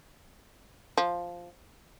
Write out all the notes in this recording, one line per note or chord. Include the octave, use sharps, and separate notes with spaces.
F3